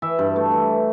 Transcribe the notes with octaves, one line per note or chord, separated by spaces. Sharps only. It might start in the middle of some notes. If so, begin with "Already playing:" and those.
E3 E5
G2
A3
E3